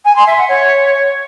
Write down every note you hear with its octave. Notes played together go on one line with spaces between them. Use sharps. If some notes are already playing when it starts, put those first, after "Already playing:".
G#5
C6
E5
F#5
C#5